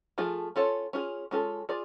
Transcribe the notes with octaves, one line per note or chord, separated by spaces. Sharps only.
F3 A3 F4 G#4
C#4 F4 A4 C#5
C#4 F4 G#4
G#3 C#4 F4 A4
F4 G#4 D5